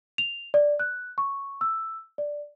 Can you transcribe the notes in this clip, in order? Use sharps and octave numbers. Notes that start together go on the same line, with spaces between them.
F7
D5
F#6
C#6
E6
D5